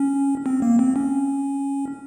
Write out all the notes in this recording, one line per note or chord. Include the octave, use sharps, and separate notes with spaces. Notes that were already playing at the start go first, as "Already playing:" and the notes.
Already playing: C#4
C4
A#3
C4
C#4